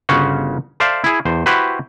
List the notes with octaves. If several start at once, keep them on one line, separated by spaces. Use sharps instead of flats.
G1 C#3 C#4 F#4 C5 F#5
A4 C5 D5 E5 F5
E4 G#4
E2 C5
E4 F#4 G4 B4 C5